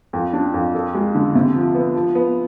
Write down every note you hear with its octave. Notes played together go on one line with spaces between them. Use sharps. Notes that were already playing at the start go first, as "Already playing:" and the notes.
F2
D4
F2
A4
G#3
D3
C3
F3
B3
F3
B3